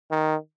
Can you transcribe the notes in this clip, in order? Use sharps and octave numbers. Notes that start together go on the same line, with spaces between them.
D#3